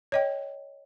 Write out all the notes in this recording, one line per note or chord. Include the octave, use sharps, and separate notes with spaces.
C#5 D#5 G5